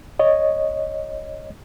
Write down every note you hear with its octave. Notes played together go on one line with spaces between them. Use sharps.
C#5 D#5